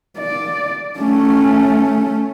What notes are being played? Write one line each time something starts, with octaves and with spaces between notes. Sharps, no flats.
D5
A3 C#4